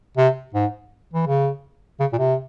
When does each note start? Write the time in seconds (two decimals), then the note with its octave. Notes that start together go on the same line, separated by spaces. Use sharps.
0.17 C3
0.54 G#2
1.13 E3
1.27 C#3
2.00 C#3
2.13 A#2
2.18 C3